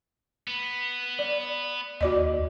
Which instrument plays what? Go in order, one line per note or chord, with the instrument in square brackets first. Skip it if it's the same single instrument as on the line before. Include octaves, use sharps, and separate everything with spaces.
[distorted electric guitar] B3
[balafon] D5
[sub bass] D#2 [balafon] F#4 D5 D#5